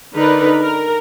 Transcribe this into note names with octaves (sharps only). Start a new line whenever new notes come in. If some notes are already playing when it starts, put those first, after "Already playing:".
D3 D#4 A#4 B4 D5
A#4